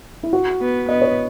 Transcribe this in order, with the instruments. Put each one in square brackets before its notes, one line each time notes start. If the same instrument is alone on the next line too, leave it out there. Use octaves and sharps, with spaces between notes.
[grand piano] E4
F#4
[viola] B3
[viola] B3 [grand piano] D#5
[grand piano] C#5